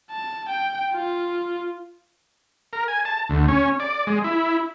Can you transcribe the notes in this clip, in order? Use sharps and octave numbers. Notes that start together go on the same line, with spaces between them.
A5
G5
F4
A#4
G#5
A5
D2
C#4
D5
G#3
E4